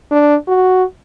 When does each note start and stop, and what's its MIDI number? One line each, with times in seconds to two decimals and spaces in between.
0.12 0.36 62
0.48 0.84 66